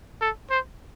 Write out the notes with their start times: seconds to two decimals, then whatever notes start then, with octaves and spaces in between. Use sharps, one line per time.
0.21 A4
0.50 C5